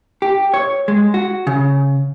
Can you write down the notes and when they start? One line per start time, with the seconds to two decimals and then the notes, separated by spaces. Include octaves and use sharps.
0.22 G4
0.54 C#5
0.88 G#3
1.14 F#4
1.47 C#3